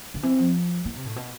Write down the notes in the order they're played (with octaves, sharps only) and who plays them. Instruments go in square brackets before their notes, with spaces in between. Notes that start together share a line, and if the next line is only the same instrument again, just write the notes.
[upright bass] D3
[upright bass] E3 [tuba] C4
[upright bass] F3
E3
C3
A2
B2